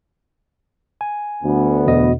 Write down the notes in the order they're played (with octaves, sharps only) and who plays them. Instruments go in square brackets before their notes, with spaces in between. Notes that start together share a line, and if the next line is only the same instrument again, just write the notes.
[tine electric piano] G#5
[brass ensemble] D2 B3
[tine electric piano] E2 B2 D#5